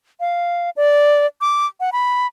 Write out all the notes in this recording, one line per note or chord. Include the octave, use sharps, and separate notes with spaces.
F5
D5
D6
F#5
B5